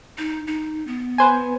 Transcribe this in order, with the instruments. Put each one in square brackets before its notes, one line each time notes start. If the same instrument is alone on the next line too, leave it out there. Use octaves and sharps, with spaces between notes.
[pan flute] D#4
D#4
B3
[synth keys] B4 C5 G#5